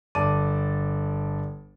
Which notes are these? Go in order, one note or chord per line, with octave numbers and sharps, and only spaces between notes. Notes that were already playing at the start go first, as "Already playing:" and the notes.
G1 D5 A5 D6 D#7